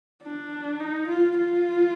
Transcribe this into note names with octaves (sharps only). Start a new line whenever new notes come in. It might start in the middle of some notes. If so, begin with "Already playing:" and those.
D4
D#4
F4
F4